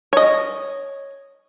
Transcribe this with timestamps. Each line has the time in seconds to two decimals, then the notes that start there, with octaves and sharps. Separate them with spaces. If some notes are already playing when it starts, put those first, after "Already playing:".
0.13 C#5 D#5